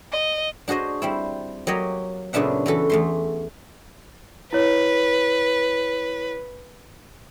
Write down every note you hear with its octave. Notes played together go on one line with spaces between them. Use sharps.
D#5
D4 F#4 G#4 C5 D#5
G3 C4 E4
F#3 A#3 G4 C#5 D#5
A#2 C#3 B3 D4 E5 F#5
E3 F#4 A4 B4
E2 A3 C6
E4 B4 C#5